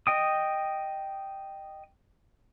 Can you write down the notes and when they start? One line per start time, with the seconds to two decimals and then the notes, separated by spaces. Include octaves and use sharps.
0.07 D#5 G5 D#6